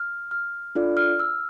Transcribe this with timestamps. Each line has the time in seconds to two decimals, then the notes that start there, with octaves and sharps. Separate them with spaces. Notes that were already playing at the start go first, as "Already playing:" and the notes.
Already playing: F6
0.31 F6
0.75 D4 F4 A4 D5
0.97 F6
1.19 E6